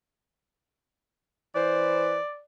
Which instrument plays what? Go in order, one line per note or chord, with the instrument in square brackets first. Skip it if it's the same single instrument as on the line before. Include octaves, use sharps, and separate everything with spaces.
[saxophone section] E3 B4 C5 [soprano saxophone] D5